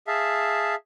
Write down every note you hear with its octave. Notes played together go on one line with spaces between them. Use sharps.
G#4 E5 F5 A5